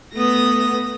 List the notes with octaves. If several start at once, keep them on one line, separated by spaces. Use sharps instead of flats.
A3 B3 D#6 A#6